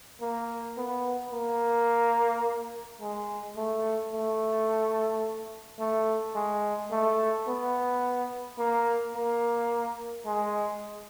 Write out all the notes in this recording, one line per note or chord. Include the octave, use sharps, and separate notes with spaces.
A#3
B3
A#3
G#3
A3
A3
A3
G#3
A3
B3
A#3
A#3
G#3